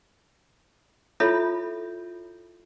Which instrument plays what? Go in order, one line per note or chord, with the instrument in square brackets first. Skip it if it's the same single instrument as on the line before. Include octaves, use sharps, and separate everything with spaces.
[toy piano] E4 F4 A4 C#5 E5 B5